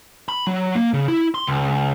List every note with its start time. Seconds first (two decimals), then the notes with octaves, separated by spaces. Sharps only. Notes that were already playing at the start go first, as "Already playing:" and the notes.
0.29 B5
0.47 F#3
0.75 A#3
0.93 C#3
1.08 E4
1.35 C6
1.47 C#2